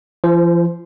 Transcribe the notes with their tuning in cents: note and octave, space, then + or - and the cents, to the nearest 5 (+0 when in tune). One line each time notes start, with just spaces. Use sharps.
F3 -45 C5 +0